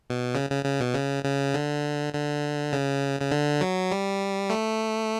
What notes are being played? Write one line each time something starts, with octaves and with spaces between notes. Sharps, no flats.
B2
C#3
C#3
C#3
B2
C#3
C#3
D3
D3
C#3
C#3
D3
F#3
G3
A3